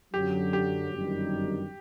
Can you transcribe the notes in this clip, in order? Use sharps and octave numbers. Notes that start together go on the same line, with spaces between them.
F#2 D3 F#3 G4
G4
G1 F#2 D#3 G3